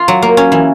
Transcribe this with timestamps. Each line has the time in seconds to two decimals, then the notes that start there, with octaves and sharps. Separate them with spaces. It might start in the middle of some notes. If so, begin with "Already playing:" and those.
Already playing: F4
0.08 F#3
0.22 A#3
0.37 C#4
0.52 E3